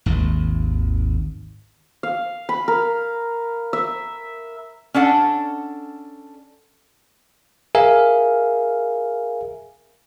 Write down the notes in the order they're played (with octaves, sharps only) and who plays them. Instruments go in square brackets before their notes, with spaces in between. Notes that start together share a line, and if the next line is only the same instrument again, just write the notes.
[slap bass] G#1 D#2
[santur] F5
B5
A#4
E5
[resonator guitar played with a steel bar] C#4 D4 A4 F#5
[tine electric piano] G#4 A#4 E5 F5 G#5